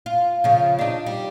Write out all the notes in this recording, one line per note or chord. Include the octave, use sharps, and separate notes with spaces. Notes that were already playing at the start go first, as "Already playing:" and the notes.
F4
C#3 F3
D4 D#4
G3